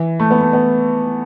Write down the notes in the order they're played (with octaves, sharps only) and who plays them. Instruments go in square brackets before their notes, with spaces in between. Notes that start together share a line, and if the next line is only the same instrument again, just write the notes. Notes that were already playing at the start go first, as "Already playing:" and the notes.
Already playing: [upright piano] E3
A3
B3
A3
B3